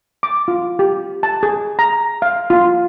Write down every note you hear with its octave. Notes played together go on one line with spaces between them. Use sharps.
D6
F4
G4
A5
G#4
A#5
F5
F4